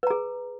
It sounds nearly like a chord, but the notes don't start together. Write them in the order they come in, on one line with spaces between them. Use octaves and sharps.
B4 A#5 G#4